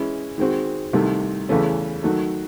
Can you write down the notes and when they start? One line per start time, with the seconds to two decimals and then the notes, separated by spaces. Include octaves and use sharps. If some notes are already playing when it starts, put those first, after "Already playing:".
Already playing: E3 G#3 C#4 E4
0.38 D#3 G#3 C4 F#4
0.93 C2 C3 D#3 A3
1.49 E2 C#3 E3 A3 C#4
2.03 D#3 F#3 A3